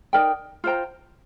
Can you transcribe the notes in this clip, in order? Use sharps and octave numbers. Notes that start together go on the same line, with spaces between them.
D#4 A#4 D5 G5
F4 C5 G5 A#5